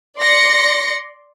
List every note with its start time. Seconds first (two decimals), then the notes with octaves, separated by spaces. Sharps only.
0.18 D5 C6 A#6 C#7